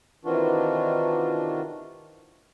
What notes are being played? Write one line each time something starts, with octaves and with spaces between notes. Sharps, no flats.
C3 D#3 E3 D4 F4 F#4